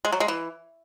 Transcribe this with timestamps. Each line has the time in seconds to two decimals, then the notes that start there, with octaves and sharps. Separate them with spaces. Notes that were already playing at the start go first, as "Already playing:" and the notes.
0.05 G#3
0.12 F#3
0.20 G#3
0.28 E3